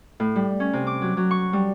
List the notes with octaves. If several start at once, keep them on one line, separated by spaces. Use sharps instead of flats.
A2
G3
C#4
C3
D6
F#3
F#3
C#6
G3